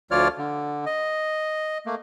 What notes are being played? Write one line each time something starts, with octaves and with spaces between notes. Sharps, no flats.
D2 F3 F4 C#5 D5 F6
D3
D#5
A3 A#3